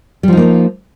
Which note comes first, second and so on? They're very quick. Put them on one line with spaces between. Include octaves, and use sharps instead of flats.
G3 F3 D#4 A#3